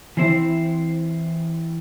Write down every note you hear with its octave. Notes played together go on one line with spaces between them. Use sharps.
E3 C4 E4 C5